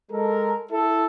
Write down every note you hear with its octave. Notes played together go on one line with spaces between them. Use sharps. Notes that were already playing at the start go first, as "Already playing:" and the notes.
G#3 A4 A#4
E4 A4